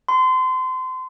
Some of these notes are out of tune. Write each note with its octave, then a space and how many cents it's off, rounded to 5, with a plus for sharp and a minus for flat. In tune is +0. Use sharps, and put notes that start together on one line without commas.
C6 -30